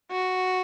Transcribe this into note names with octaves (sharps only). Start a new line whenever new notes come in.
F#4